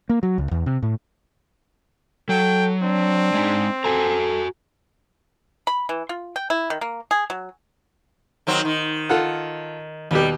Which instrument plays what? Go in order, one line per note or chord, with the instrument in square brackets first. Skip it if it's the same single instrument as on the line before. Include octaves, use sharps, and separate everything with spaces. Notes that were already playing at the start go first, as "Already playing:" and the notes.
[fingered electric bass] A#3
F#3
C#2
E2
C3
A2
[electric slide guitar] F#3 [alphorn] A4 [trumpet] G5
[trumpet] C4 [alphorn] D4
[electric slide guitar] G#3 D#4
[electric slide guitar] F#4 G#5 A#5 [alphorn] A4
[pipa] B5
E3
F4
G5
E4
D#3
A#3
G#4
F#3
[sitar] D#3 F#3 C4
D#3
[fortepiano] F4 A4 F#5
[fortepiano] D#2 B2 G4 [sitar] G3